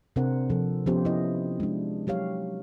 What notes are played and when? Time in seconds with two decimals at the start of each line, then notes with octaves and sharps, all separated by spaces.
0.16 C3 C4 D4 A#4 C5 F#5
0.50 C3 F3 A4
0.86 F3 B3 C#4 F4 G4 C5
1.05 E4 D#5
1.60 G#3 D4
2.07 F#3 G4 C#5 F5